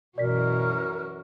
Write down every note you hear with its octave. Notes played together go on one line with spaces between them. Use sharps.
F#2 B2 E3 F#4 A#4 D5 B6